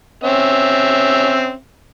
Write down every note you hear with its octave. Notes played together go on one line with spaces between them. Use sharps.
C4 C#4 E5